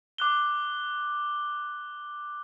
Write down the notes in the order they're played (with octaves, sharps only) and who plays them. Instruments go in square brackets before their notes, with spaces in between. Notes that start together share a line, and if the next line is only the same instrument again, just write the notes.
[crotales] D6 F#6 G7